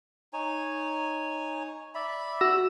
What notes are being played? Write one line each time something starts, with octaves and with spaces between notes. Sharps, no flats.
D#4 C#5 G#5
D5 E5 B5
F#4 E6 A#6